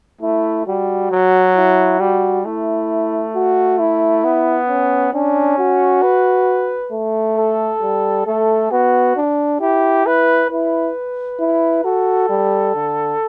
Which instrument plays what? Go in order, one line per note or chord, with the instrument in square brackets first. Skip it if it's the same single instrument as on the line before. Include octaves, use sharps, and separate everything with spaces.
[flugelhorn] A3 [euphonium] E4
[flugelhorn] G3 [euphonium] F#4
[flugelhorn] F#3
[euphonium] E4
[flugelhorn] G3 [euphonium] F#4
[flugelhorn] A3 [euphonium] E4
[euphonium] F#4
E4
[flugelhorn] B3
[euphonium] C#4
[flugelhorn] C#4 [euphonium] D4
[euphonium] F#4
[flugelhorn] B4
[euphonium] A3
[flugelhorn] A4
[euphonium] G3
[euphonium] A3 [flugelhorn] A4
[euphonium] B3 [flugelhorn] F#4
[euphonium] D4
[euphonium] E4 [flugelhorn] G4
[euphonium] E4 [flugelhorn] B4
[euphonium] E4 [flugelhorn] B4
[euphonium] E4
[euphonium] F#4 [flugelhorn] A4
[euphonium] G3
D3